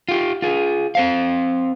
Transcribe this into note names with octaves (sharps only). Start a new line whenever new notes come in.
F4 G4
F4 G#4
C4 C5 F5